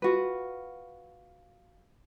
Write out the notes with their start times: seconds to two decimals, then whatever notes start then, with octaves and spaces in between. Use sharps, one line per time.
0.02 F4 F#4 B4